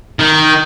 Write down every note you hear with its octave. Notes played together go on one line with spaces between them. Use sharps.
D#3